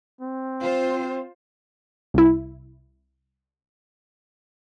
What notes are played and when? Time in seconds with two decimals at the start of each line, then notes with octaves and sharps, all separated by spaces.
0.21 C4
0.60 F4 C5
2.14 C2 E4